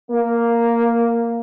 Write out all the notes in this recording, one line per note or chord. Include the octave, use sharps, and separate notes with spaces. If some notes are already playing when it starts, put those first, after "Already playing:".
A#3